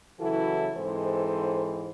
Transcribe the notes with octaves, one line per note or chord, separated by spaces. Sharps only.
C#3 E3 F#3 E4 F#4 A4
G#2 E3 G#3 C4 A4 C5